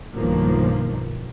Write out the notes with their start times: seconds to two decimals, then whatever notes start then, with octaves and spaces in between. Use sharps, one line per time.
0.15 B1 G2 D#3 F3 A#3